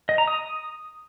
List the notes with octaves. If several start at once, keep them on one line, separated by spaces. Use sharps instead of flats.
D#5
A#5
D#6